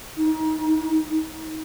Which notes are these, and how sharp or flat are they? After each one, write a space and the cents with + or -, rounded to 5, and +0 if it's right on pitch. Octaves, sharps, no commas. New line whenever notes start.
D#4 +25